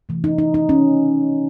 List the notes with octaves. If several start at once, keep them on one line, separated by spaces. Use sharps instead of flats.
C3 E3 A3
D#4
D#4
D#4
C#4